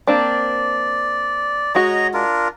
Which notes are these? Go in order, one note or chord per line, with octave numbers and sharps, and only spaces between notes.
A#3 C4 D4 D5
G#3 F#4 C#5 D#5 A#5
D4 F4 A#4